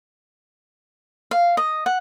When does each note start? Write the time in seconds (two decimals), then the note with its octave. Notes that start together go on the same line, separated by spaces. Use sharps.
1.31 F5
1.57 D#5
1.86 F#5